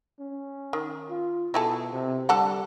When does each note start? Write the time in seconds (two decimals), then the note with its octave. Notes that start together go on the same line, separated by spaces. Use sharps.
0.20 C#4
0.73 D#3
1.10 F4
1.54 B2 E4 G#4 A4
1.92 C3
2.29 D3 G3 A4 F#5